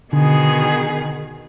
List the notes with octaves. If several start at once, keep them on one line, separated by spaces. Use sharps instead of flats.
B2 D3 D#3 G#4